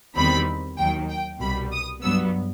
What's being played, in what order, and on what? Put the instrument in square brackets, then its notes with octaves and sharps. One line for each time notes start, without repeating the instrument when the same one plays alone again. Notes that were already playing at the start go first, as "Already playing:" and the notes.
[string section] E2 D#3 G3 C4 B5
D#2 D#3 F#3 G5
G5
C2 B2 G3 B5
D#6
G2 F#3 B3 E6